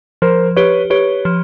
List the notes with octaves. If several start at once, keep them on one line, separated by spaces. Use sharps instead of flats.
F3 A#4 C5
G4 B4 C#5
G4 B4 C#5
F3